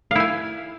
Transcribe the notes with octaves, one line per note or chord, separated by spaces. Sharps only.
E4 F5 G#5